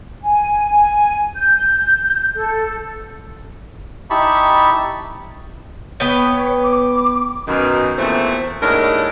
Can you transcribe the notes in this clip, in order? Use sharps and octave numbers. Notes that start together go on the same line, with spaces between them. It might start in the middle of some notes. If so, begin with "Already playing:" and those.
G#5
G#5
G6
A4
D#4 E4 G4 A5 B5 C#6
B3 B4 C#5 G5
D6
F#2 B2 D#3
E2 A#2 A3 C4
D#2 A2 C#3 G#3 D4 A#4